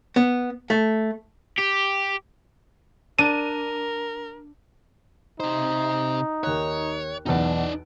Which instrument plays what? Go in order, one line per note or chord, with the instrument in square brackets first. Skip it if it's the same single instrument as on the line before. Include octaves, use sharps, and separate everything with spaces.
[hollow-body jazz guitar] B3
A3
[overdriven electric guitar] G4
[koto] D4 [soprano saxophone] A#4 [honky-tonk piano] D#7
[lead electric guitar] C3 C5 [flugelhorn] D#4
[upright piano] D#2 F#6 [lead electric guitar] C#5
[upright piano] B1 E2 [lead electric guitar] D#4 D5